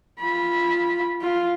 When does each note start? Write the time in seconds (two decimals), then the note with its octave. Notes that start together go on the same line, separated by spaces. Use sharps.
0.20 F4 B5
1.21 F4